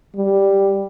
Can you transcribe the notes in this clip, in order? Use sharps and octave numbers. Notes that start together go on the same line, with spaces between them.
G3